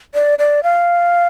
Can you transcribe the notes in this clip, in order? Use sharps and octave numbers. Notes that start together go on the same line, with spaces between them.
D5
D5
F5